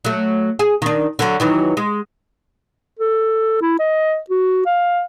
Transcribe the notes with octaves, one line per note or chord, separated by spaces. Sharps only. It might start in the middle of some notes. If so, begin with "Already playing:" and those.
F#3 A3
G#4
D#3 D4
D3 F#3
D#3 E3 F#3
G#3
A4
E4
D#5
F#4
F5